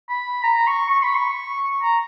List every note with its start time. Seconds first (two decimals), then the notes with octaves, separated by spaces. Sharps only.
0.09 B5
0.44 A#5
0.67 C#6
0.90 C#6
1.03 B5
1.15 C#6
1.83 A#5